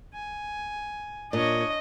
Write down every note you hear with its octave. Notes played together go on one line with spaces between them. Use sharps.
G#5
A#2 D4 C#5 D#5